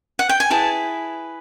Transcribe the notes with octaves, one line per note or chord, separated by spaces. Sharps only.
F#5
G5
G#5
E4 G#4 B4 A5